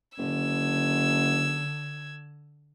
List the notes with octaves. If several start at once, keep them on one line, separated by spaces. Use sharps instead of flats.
F#1 D3 E6 G#6